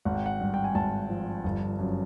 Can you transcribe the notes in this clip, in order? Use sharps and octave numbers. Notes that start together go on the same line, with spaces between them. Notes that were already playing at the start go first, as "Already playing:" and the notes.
G#1 F#5
G5
F#5
G2
G5
G#5
G#1 A5
F3
G1
F#2